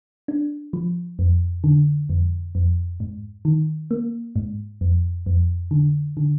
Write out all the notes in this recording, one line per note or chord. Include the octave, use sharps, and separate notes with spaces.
D4
F3
F2
D3
F2
F2
G#2
D#3
A#3
G#2
F2
F2
D3
D3